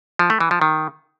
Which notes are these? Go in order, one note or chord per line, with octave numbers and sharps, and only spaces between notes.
F3
A3
E3
F3
D#3